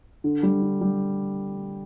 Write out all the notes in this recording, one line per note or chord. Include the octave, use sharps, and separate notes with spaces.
D3
G3
D3
G3